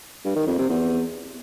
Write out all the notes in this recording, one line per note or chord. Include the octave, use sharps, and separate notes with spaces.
G2
D#3
F2
C3
E2